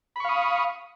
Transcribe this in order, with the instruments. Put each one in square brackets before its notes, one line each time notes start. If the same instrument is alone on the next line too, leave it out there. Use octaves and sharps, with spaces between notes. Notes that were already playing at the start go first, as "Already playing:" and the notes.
[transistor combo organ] B5
C#6
F5
D#6